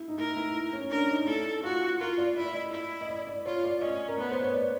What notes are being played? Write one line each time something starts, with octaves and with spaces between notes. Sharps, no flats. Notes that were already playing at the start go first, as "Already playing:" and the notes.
Already playing: E4
D#4
E4 A#4
E4
C#4
D4 A#4
D#4
E4 A4
F4 F#4
F4 A#4
D5
E4 D5
D#5
E4
D#5
D5
D5
F4 C#5
D5
C#4 D#5
A#4
B3 B4
C5
C#5
D5